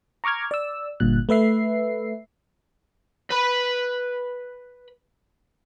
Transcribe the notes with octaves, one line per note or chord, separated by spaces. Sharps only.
A#5 C#6 D6 F6 G#6
D5 E6
G1 G2 A#2 F#6
A3 B4 E5 C7
B4 B5